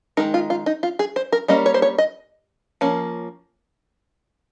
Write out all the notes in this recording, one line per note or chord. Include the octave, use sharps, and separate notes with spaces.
D#3 G#3 D#4 A#4
F4
F4
D#4
F4
G#4
C5
A#4
G3 A#3 C#4 D#5
C#5
C5
C#5
D#5
F3 A#3 C#4